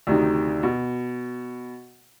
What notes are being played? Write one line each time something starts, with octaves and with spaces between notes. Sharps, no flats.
D2 C3 D#3
B2